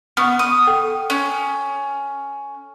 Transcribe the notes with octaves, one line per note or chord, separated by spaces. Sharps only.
B3 F#5 C#6 F6
D#6
A4 G5
C#4